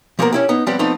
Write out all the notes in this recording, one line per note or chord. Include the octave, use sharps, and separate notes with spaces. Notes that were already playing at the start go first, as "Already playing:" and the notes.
F3 A#3 B3 F#4 G4 A#4
C#4 E4 G4
B3 D#4
F3 G3 B3 C4 G4 D5
F3 A3 B3 C4 D#4